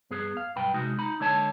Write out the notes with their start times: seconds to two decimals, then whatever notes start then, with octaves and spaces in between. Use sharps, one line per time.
0.10 G2 B3 G#4
0.37 F5
0.56 B1 G2 B4 G5
0.74 C3 G#3 D#4 F#4
0.98 D#4 B5
1.20 D3 G#3 C#5 A5